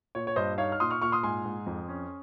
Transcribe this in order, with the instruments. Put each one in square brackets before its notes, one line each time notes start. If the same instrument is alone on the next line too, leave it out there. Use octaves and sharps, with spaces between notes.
[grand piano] A#2 C#5
C#5
G2 C5 D#5
D#4 C#5 F5
F6
A#2 C6 D#6
C#6 F6
A#2 C#6 F6
C6 D#6
G#2 G#5 C6
G#2
F2
C#4